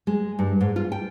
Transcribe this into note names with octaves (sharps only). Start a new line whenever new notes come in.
G#3
G2
G#2
F4
G5